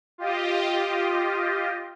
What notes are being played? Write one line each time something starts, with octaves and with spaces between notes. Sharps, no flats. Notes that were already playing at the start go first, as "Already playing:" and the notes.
F4 G4 D#5